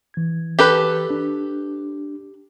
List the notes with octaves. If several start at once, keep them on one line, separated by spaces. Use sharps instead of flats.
E3 G#6
G4 A4 B4
D4